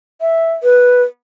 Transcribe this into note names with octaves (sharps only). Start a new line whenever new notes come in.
E5
B4